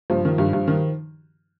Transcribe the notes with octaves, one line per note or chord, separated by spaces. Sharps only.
G2 F3
D#3
G2
G2
D#3